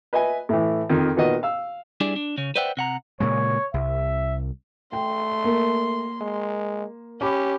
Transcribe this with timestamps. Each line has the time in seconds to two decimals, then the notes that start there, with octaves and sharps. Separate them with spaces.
0.13 B4 D#5 E5 G#5
0.49 A2 E3
0.90 F2 D#3
1.17 A#2 D#3 B3 F#4 D#5
1.43 F5 E6
2.01 G3 D4 E4 G#4 D5
2.16 D4
2.38 C#3 C#4
2.56 B4 C5 D5 E5 F#5 G5
2.77 C3 F#5 A#5
3.20 A#2 C#3 G#3 C#5
3.74 C2 E5
4.93 A3 G5 C6
5.44 A#3
6.21 G#3
7.21 C#4 G4 B5 D6